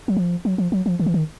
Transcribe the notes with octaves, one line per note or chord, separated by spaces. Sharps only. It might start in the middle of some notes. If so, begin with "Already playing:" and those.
F#3
F3
F#3
F3
F#3
F3
D#3
E3
D#3